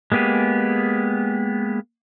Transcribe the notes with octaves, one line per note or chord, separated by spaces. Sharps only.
G#3 A#3 B3 G4 G#4